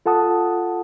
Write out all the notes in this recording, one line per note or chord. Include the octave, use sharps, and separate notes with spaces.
F4 A4 F#5 A5 D#6